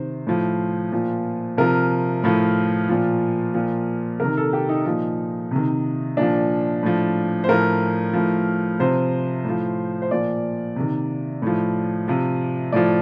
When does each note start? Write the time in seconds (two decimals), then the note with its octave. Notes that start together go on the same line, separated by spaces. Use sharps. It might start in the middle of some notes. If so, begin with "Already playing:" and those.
Already playing: C3 D#3 C5
0.27 A2 F3
0.92 A#2 F3
1.57 C3 F3 A#4
2.24 A2 F3
2.89 A#2 F3
3.54 A#2 F3
4.20 C3 D#3 A#4
4.37 A4
4.53 G4
4.69 D#4
4.86 A#2 F3 D#4
5.51 C3 D#3
6.17 A#2 F3 D4
6.83 A2 F3
7.44 C5
7.48 A2 F3 A#4
8.13 A2 F3
8.80 C3 F3 C5
9.45 A2 F3
10.02 C5
10.11 A#2 F3 D5
10.76 C3 D#3
11.42 A2 F3
12.08 C3 F3
12.72 A2 F3 D5